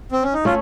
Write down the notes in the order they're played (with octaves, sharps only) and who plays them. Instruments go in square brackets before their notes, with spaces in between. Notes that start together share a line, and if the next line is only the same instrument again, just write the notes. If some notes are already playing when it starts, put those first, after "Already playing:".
[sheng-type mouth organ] C4
C#4
D#4
[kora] A3 C#4 [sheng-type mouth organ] F4